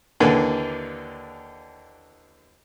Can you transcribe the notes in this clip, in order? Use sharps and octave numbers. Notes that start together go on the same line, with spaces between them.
D#2 D3 E3 A#3 D4 G#5